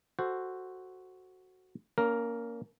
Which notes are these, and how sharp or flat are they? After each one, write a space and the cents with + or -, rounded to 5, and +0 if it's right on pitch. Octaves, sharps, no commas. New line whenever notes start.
F#4 +0 A4 +0 C5 +0
A#3 +0 C#4 +35 A#4 +0